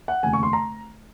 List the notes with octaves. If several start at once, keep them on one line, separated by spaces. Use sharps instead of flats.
F#5
F1 D#2 C#3 G#5
C#6
C6
A#5